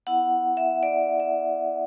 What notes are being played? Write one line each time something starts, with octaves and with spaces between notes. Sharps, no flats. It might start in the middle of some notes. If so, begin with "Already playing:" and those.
B3 E4 F#5
E5
D5
E5